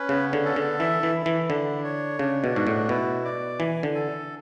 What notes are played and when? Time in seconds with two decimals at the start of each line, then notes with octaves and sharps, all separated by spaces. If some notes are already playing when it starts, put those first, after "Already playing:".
Already playing: C#4 B4
0.09 C#3 B3
0.33 D3
0.45 A4
0.56 D3
0.80 E3 E5
1.03 E3
1.15 E4
1.26 E3
1.49 D3 D4
1.84 C#5
2.19 C#3 D4
2.44 B2
2.55 G#2 F#4
2.67 A2
2.89 B2 E4
3.25 D5
3.59 E3 G#5
3.83 D3
3.95 A4